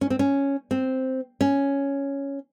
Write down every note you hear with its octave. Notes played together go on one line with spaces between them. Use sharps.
C#4
C4
C#4
C4
C#4